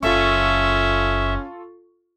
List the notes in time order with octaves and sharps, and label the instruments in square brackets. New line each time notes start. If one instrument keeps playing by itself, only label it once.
[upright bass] F#1 [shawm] C#4 [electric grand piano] F4 A4 C#6 [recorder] E5